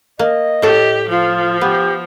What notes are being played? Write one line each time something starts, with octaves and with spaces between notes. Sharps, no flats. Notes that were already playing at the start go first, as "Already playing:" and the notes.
A#3 D#5
A2 G4 A4
F3 F4
B3 G4